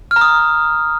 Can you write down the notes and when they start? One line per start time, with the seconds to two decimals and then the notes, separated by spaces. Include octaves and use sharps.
0.11 F6
0.16 A#5
0.21 D#6